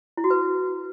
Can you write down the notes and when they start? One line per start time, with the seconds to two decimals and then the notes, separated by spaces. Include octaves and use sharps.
0.17 E4
0.24 F#4
0.30 B4